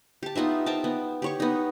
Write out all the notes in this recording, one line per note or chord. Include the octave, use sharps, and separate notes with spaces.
G4 A5
B3 D#4 F4 E5
A#4 C5 G5 A5
B3
G4 C#5 C#6
B3 D#4